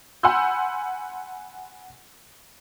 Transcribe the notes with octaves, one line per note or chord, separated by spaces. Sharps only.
F#5 G#5 B5 C6 E6 G6